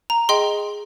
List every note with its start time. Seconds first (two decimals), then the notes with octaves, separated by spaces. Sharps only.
0.10 A#5
0.29 G#4 D#5 G5 C6